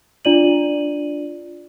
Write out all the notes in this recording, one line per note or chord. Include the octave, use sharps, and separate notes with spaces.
D4 F4 D5 D#7 F#7